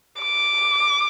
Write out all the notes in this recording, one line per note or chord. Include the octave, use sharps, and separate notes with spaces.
D6